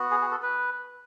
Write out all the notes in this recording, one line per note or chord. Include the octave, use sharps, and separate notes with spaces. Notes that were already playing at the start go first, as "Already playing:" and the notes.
Already playing: B3 F#4
G#4
G#4
A4
B4